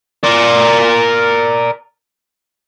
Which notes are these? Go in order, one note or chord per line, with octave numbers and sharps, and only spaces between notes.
A#4 D5